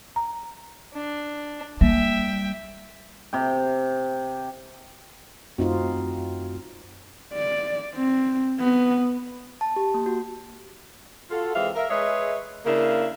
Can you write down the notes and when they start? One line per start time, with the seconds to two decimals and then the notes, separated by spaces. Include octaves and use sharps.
0.16 A#5
0.94 D4
1.81 G3 A#3 E5 G5
3.33 C3 G5
5.58 F#2 A3 C4 D#4 F4 F#4
7.34 D5
7.95 C4
8.60 B3
9.61 A5
9.76 G4
9.94 A#3
10.06 F#4
11.31 F4 F#4 A4
11.54 E3 G#3 C4 E5 F5
11.75 A#4 E5 F5
11.90 G#3 G#4 B4 C#5 D#5 E5
12.66 C#3 A#3 D4 E4 A#4